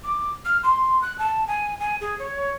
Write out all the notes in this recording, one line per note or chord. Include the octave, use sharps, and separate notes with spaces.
D6
F6
C6
F#6
A5
G#5
G#5
G#4
C#5